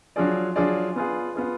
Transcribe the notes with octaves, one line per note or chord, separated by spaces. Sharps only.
F#3 D4 F4 G#4 D5
F#3 D4 F4 G#4 D5
B3 F4 G#4
B3 F4 G#4